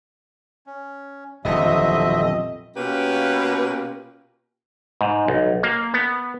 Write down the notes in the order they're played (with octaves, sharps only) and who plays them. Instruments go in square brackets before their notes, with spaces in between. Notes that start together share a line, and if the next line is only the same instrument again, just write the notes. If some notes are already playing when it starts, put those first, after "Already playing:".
[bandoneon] C#4
[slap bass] D#1 B1 D3 [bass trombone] F2 [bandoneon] B2 C4 E5 [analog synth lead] D#5
[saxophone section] B2 A#3 C#4 F4 G4 B4
[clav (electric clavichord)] G#2
B1
A#3
B3